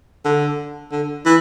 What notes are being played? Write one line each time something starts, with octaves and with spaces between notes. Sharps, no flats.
D3
D3
E3